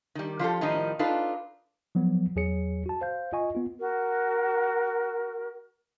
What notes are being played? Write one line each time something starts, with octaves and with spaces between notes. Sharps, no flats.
D#3 G3
F3 F4 G4 A4
A2 D#3 F3 G3 D#4
D4 D#4 F4 A4 B4
F3 F#3 B3
E2 F#3 G#4 C#5 C#7
F#4 A5
C5 F5 G6
F4 D#5 G#5 C#6
B3 F4
F#4 A#4